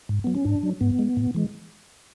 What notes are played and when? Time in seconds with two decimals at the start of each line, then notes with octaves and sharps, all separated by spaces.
0.09 G#2
0.24 F#3 B3
0.35 C#4
0.45 G#2 D4
0.63 F#3
0.81 G#2 B3
0.99 G#3
1.17 A2
1.34 E3 G#3